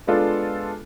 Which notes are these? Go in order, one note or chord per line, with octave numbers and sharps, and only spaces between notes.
G#3 B3 D4 F4 A4